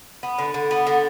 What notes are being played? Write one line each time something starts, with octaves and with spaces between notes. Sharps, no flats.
B3
D3
D3
B3
D3